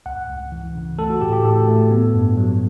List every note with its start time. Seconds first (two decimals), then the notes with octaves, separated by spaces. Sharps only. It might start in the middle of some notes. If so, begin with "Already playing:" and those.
0.06 C#2 F#5
0.29 C#2
0.52 E3
0.75 C#3
0.98 A3 A4
1.10 F#4
1.21 A2 G4
1.33 G4
1.45 A2 A4
1.68 A3
1.91 B3
2.14 G2
2.37 F#3